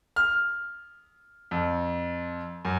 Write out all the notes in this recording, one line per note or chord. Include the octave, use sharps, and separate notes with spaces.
F6
F2
F#2